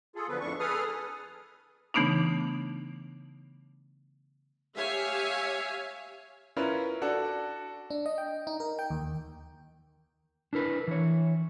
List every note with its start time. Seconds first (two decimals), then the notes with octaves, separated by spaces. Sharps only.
0.16 F4 G#4 A4
0.28 D3 F3 F#3 B3 B4
0.40 F2 A2 D4 C#6
0.59 G#4 A4 B4 D#6 F6
1.94 C#3 E3 A3 B3 D4 D#4
4.75 G4 C#5 E5 F5 G#5
6.57 C#4 E4 F4 A#4 B4
7.02 D4 F#4 A4 D5
7.90 D4
8.06 D#5
8.18 G5
8.47 D#4
8.60 A#4
8.79 G5
8.91 D#2
10.53 D4 E4 A#4 B4
10.87 E3 C#5